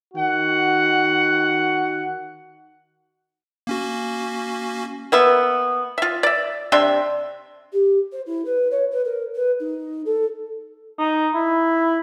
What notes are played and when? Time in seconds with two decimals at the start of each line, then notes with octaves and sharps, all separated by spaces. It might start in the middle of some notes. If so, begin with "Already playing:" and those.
0.14 D#3 F#4 F#5
3.67 A#3 C#4 F#4
5.12 A#3 B3 E5
5.98 F4 E5
6.23 D5 E5
6.72 C3 D4 E5 C6
7.73 G4
8.12 C5
8.26 E4
8.45 B4
8.71 C#5
8.91 B4
9.04 A#4
9.35 B4
9.59 D#4
10.05 A4
11.00 D#4
11.34 E4